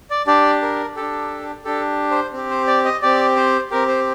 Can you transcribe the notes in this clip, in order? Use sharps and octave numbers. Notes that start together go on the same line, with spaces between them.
D5
D4 G4 D5
A#4
D4 G4 A4
D4 G4 A4
C5
C4 G4
C5
D5
D#5
C4 G4 D5
C5
C4 G4 A#4
C5